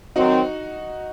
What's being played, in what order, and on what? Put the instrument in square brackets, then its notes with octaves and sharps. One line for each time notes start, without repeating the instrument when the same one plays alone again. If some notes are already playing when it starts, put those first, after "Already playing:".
[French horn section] D#3 F#3 C4 [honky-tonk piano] D#4 F#4